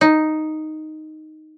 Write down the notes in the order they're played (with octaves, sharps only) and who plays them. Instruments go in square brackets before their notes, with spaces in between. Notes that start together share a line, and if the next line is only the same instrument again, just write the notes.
[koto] D#4